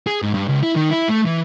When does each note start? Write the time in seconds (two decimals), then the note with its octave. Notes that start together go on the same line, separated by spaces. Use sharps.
0.07 G#4
0.22 G#2
0.34 G2
0.48 C#2
0.64 E4
0.76 D#3
0.91 E4
1.09 A3
1.26 E3